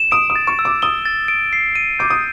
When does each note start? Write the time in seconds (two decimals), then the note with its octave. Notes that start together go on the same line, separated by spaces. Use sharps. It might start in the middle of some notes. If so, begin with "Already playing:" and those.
Already playing: E7
0.11 D#6 D7
0.30 D#6
0.36 A6
0.47 C#6
0.59 E6
0.65 D6
0.82 D#6 G7
1.06 A6
1.28 D7
1.53 C7
1.75 D#7
1.99 D6 G6
2.10 D#6